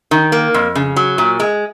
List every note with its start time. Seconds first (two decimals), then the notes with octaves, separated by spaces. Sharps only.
0.11 D#3
0.32 A#3
0.54 F2
0.75 C#3
0.96 F#3
1.18 A#2
1.40 G#3